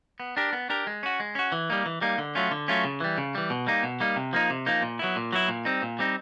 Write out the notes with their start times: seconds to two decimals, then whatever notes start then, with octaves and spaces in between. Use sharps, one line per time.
0.20 B3
0.37 D4 G4 A#4
0.53 B3
0.70 D4 G4 A#4
0.87 G#3
1.03 C#4 F#4
1.20 G#3
1.35 C#4 F#4
1.52 E3
1.70 G3 A#3 D#4
1.86 E3
2.01 G3 A#3 D#4
2.18 D3
2.35 F#3 A3 C#4 F4
2.51 D3
2.68 F#3 A3 C#4 F4
2.85 C#3
3.00 E3 G3
3.18 C#3
3.35 E3 G3
3.50 B2
3.67 G3 A#3 D#4
3.83 B2
4.00 G3 A#3 D#4
4.16 C3
4.33 F3 A#3 D#4
4.50 C3
4.66 F3 A#3 D#4
4.82 A#2
4.99 F#3 B3 E4
5.16 A#2
5.33 F#3 B3 E4
5.48 A#2
5.65 G3 C4 D#4
5.82 A#2
5.99 G3 C4 D#4